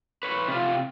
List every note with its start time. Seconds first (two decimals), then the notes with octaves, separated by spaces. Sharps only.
0.23 B4 C#5
0.48 C3 F4